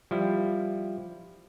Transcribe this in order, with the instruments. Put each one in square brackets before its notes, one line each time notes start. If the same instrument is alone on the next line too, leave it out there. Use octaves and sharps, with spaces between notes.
[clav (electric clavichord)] F3 G3 E4